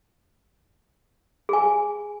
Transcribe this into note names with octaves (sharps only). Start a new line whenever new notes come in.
G#4 G#5